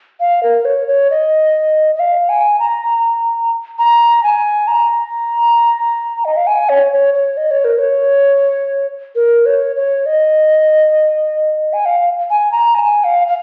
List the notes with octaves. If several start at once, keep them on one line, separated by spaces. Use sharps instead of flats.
F5
A#4
C#5
C#5
D#5
D#5
F5
G#5
A#5
A#5
G#5
A#5
D#5
F5
G#5
C#5
C#5
C#5
D#5
C#5
A#4
C#5
A#4
C#5
C#5
D#5
G#5
F5
G#5
A#5
G#5
F5
F5